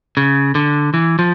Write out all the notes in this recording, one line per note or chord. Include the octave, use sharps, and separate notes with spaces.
C#3
D3
E3
F3